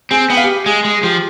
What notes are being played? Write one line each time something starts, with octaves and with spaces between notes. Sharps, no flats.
C4 G#4 G#5
B3 G5
F5
G4 G5
G#3 G#4 G#5
G#3
F3 G4 G5